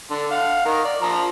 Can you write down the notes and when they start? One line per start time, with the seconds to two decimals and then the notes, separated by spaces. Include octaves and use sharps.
0.10 D3
0.31 F5 F#5
0.65 D#3 A#4
0.85 D5
1.02 F3 A#5